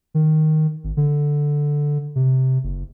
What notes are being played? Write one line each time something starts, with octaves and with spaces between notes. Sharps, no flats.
D#3
G#1
D3
C3
F#1